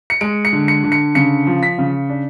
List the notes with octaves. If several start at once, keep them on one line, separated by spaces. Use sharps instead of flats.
C#7
G#3 D7
C#7
D3
C#7
D3
C#7
C#3 C#7
F3
B6
C#3
D4